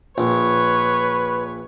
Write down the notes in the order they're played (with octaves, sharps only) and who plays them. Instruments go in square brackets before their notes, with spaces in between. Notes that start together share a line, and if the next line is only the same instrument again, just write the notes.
[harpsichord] A#1 [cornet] B4 [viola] C#5